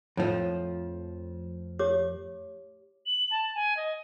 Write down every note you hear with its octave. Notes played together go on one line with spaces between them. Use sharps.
F2 A2 F3 D#5
G4 C#5 D6
F#7
A5
G#5
D#5